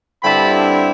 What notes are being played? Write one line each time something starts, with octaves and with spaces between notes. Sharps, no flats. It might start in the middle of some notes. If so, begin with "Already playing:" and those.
G2 D3 G3 C4 E4 A5 B5